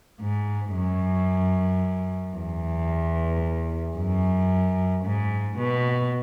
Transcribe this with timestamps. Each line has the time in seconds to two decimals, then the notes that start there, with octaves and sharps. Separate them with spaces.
0.21 G#2
0.75 F#2
2.36 E2
3.97 F#2
5.05 G#2
5.58 B2